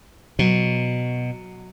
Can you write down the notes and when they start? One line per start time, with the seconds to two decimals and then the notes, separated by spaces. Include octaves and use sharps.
0.39 B2 F#3